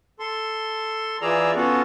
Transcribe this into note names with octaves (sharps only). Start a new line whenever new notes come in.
A4 C6
E3 F4 G#4 D5 A#5 E6
B3 C#4 F4 F#4 A4